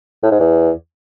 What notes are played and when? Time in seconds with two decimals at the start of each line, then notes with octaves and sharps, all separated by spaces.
0.23 A2
0.31 G#2
0.40 E2